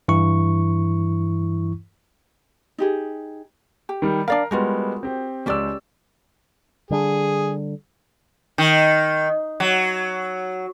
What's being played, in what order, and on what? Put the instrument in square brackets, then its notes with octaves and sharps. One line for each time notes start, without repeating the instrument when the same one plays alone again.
[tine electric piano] G2 E3 E4 C#6
[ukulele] D#4 G4 G#4
G4
[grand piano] D#3 G3
[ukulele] D4 D5 F5 [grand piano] A#4
[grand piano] G3 G#3 B3 [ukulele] F4 F#4 A#4
[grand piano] C4 G4
[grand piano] C#2 E6 [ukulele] C#4 G4 D5
[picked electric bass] D3 G3 D4 [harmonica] G#4
[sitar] D#3
F#3